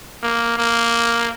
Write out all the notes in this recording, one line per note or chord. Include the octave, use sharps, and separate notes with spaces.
A#3
A#3